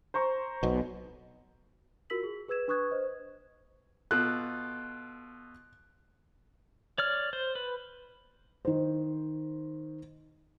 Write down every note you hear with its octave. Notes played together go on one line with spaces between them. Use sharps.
C5 A#5 C#6
B1 B2
F4 F#4 A#4 E6 B6 F#7
G#4
G#4 B4 E6 G#6 E7
D4 B4 C#6 D#6 F#6 G#6
C5 D#5
B2 F4 A4 F#6
C#5 D5 F6
C5
B4
D#3 C5